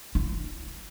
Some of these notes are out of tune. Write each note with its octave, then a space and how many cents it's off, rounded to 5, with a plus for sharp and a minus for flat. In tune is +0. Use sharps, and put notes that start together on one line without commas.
E4 +35